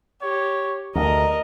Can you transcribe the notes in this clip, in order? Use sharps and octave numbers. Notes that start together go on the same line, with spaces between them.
G4 C#5
D2 A#4 D#5 A#5